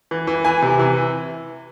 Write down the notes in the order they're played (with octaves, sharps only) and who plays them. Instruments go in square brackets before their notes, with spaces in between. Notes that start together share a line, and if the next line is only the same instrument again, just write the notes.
[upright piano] E3
E3
E3 G#5
C3
E3